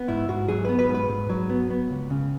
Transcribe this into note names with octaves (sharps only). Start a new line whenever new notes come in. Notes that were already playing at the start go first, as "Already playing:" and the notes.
Already playing: B3
G#2 E4
G#2 F#4
F#3 G#4
B3 B4
B4
G#2
B4
G#2
F#3
B3
B3
C#2
C#3